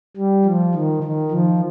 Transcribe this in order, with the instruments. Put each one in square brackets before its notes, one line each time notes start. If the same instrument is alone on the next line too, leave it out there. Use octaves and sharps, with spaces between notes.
[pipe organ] G3
F3
D#3
D#3
F3